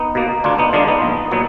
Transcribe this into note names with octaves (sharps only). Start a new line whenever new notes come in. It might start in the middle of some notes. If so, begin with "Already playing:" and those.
Already playing: B3 D#4
B2 A#3
D2 D4 F4
B3 D#4
D3 G#3 D4 F4
B3 D#4
A#1
A#2 F#3 B3